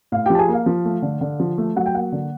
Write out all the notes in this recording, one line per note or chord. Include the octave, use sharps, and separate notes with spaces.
A2 F5
F3 G4 G5
A5
G#4 G#5
A#3 F5
F3
A3
D3
D3
F3
A3
F#3 F#5
G5
A#3 F#5
D3